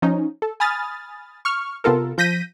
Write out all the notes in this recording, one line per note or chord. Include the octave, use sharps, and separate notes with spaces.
F3 C#4 D#4
A4
G#5 B5 D#6 F6 A6
C#6 F6
C3 B3 F4 A4 A#4
F3 G6 A#6 B6 D#7